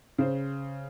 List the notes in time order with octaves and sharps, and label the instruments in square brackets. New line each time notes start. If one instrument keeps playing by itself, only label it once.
[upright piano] C#3 C5